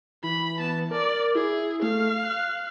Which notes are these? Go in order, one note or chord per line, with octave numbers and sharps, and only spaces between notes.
E3 B5
B3 A5
A#4 D5
E4 G#4
A3 F5
F#6